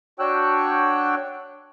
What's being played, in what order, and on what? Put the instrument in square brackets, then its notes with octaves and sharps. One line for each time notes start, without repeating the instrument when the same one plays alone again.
[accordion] D4 F#4 C#5 G5 E6 F#6